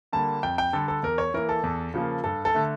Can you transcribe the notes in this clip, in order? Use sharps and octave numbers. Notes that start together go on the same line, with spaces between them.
D3 G3 A#3 A5
F2 G5
G5
D3 G3 A4
A4
E2 A#4
C#5
E3 A#3 A#4
A4
E2
C#3 F3 A#3
G2 A4
A4
D3 A3